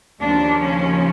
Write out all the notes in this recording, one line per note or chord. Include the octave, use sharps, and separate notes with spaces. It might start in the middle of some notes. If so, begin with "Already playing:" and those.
D#2 C#3 F3 D4
C#4